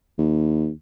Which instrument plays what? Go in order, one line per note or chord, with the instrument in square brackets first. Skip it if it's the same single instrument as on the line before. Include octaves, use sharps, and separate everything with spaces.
[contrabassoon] D#2